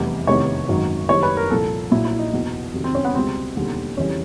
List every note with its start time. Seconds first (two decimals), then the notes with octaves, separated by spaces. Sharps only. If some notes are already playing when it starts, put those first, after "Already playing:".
Already playing: F1 E2 C3 E3 G3
0.27 F1 E2 C3 D#3 C#5
0.68 G#1 F#2 D#3 F#3
1.09 F#1 F#2 D#3 G3 C#5
1.23 B4
1.37 A#4
1.50 C2 A#2 F3 A4
1.91 A#1 A#2 F#3 E4
2.05 E4
2.19 D#4
2.33 F#1 E2 B2
2.74 F2 C3 D#3 F#3
2.84 C4
2.95 C#4
3.05 B3
3.15 C#2 B2 G3 C4
3.56 E1 D#2 D3 G3
3.97 F2 C#3 E3 G3 C#4